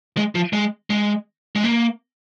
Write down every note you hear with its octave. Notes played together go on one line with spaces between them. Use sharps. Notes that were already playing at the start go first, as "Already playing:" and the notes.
G#3
F3
G#3
G#3
G#3
A#3